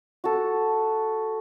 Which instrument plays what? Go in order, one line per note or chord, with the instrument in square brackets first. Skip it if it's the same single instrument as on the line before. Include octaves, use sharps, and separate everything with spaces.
[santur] F#4 A4